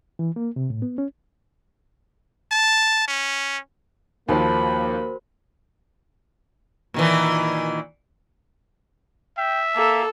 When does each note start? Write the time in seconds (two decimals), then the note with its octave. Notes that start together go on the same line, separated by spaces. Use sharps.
0.19 E3
0.36 A#3
0.56 C3
0.70 A2
0.82 B3
0.98 C#4
2.52 A5
3.08 C#4
4.29 D#2 F3 A#3 F#4 A#4 C5 B5
6.94 A#2 D#3 E3
9.38 E5 G5
9.76 A#3 A4